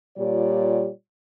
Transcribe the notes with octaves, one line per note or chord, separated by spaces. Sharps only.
A#2 G3 F4 G4 C#5 D5